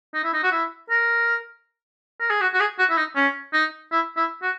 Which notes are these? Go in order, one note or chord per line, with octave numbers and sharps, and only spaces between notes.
D#4
E4
D#4
F#4
E4
A#4
A#4
G#4
F#4
F#4
G#4
F#4
E4
D#4
C#4
D#4
E4
E4
F#4